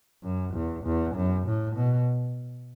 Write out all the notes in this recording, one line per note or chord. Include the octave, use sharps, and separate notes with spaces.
F#2
E2
E2
F#2
A2
B2